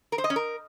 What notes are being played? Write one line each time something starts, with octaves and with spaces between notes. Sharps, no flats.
A#4
C5
D#5
C#4
A#4